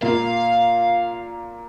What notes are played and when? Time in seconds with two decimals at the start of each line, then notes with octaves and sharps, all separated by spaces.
0.02 A#2 A#3 F5